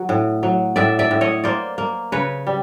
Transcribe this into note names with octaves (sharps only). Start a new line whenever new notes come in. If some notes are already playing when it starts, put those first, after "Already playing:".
Already playing: F#3
A2
F#3
A2 D5 E5
D5 E5
A2
C#5 D#5
A#3 C5 D5
A#3
C#3 B4 C#5
G3